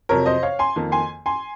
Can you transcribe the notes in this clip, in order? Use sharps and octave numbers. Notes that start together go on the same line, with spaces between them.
F2 C3 F#3 A#4 C#5
C5 D#5
C#5 F5
G#5 C6
F2 D#3 A#3
G#5 C6
G#5 C6